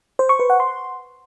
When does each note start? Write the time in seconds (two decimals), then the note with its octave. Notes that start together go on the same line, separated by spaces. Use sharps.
0.19 C5
0.29 C#6
0.39 B4
0.50 F#5
0.60 C6